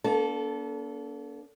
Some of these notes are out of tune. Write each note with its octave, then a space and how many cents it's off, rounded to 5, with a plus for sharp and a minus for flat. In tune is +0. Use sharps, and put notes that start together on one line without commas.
A#3 +40 D4 -45 A4 -15